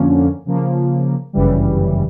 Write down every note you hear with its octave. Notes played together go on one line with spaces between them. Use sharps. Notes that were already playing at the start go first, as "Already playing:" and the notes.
Already playing: F2 D3 F3 A#3 C#4
C#3 F3 A#3
G1 F#2 C#3 E3 G3